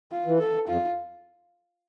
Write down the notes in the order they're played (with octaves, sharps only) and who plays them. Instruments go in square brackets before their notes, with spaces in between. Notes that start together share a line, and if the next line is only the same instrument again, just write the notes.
[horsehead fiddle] F4
[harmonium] E3
[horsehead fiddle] A4
[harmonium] F2 [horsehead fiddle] F4